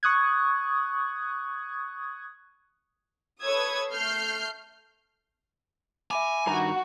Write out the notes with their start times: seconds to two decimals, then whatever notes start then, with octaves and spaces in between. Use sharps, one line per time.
0.03 C#6 D#6 F#6 G#6
3.43 A4 B4 C#5 D#6 E6 G#6
3.92 A3 F6 G6 C7
6.11 E5 G#5 B5 D6
6.47 G2 D#3 F#4 A#5